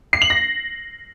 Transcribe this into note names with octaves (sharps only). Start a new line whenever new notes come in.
C7
F#7
A#6